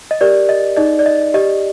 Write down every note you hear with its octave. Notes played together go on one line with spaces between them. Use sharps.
D#5
G4 A#4 D5
D#5
D#4 G#4 D5 D#5
D5
D#5
G4 D5 D#5